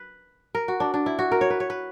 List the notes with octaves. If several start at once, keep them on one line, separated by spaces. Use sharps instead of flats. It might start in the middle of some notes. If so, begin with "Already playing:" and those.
Already playing: B4
A#4
F#4
D4
D4
E4
F#4
A#4
C#5
B4
C#5
B4